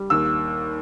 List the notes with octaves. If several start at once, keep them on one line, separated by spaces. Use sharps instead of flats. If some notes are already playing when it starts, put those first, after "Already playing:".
Already playing: G3
D#2 E6